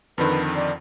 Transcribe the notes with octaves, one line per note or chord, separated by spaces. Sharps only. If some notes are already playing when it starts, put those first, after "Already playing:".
F2 D3 D#3 B4
D5